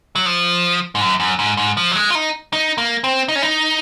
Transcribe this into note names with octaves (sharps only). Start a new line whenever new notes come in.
F#3
F3
G#2
F#2
F#2
G#2
G#2
F3
F#3
G#3
F4
D#4
D#4
A#3
C4
D#4
C#4
D#4